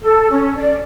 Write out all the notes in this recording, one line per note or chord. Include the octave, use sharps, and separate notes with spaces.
A4
C#4
D5